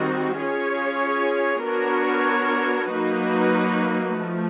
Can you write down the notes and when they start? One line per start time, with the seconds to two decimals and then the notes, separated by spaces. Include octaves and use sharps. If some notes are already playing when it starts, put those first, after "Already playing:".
Already playing: D#3 G3 C4 D#4 F#4
0.38 C#4 F4 G#4 C#5
1.64 B3 D4 F#4 A#4 C#5
2.92 F#3 A#3 D#4 F#4 B4
4.18 F3 A3